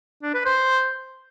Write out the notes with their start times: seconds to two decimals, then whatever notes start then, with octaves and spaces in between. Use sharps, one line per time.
0.22 D4
0.34 B4
0.45 C5